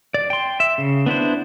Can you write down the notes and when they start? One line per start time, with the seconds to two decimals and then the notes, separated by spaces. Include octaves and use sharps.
0.14 D5
0.30 G5 C6
0.60 E5
0.78 C#3
1.06 B3 D4 E4 C5